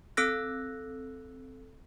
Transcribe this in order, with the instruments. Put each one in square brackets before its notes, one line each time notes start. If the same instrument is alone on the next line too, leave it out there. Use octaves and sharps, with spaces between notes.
[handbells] C4 A4 E6 F#6 A#6